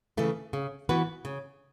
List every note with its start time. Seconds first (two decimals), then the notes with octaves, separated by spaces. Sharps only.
0.17 C#3 E3 A3
0.53 C#3
0.89 E3 B3 F#4 B4
1.25 C#3